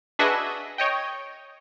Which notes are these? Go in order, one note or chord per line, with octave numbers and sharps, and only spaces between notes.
D4 F#4 G#4 B4 D#5 E5
C#5 D#5 G5